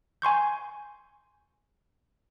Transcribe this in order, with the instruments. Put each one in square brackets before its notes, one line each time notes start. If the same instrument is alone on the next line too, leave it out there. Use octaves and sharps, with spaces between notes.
[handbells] G#5 C6 C#6 G6